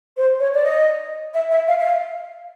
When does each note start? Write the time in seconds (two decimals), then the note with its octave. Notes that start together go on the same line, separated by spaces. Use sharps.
0.17 C5
0.39 C#5
0.54 D5
0.63 D#5
1.33 E5
1.50 E5
1.68 F5
1.79 E5
1.85 F5